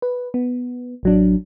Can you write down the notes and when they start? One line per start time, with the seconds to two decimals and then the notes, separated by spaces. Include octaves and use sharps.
0.02 B4
0.34 B3
1.03 A1 F#3 D4